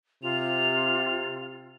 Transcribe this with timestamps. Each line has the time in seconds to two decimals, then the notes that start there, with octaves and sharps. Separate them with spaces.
0.23 C3 F4 F7